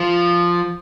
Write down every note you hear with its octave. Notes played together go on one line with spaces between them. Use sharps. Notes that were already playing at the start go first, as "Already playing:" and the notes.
Already playing: F3